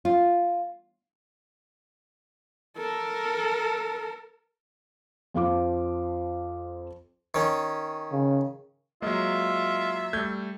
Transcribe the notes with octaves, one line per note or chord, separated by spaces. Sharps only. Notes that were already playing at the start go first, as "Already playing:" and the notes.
F4
A4 A#4
F2 F3 F5 D6
D#3 C#4
C#3
F#3 G#3 A#3 F4 E5
G3 A3 G6 G#6